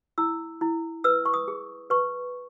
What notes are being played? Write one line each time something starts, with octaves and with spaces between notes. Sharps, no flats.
E4 E6
E4
B4 E6
C#6
D#6
G#4
B4 C#6